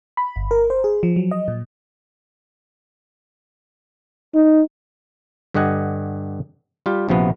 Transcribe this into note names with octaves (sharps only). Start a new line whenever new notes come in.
B5
G1
A#4
C5
G#4
F3
F#3
D#5
A#2
D#4
G2 D3 G4 D#5 F#5 G#5
G3 F4 G4
A#1 C3 F3 B3 F#4